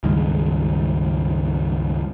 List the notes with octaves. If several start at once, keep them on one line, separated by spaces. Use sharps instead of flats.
C#2 G2 D#3 G#3